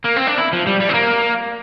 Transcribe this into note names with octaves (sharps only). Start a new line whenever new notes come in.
A#3
C4
D4
E4
F3
G3
G3
C4
A#3